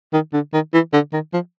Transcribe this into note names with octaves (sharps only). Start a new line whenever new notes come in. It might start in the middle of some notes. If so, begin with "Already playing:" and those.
D#3
D3
D#3
E3
D3
D#3
F3